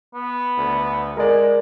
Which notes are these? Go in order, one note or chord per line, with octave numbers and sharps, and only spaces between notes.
B3
D2
G#3 A#4 D5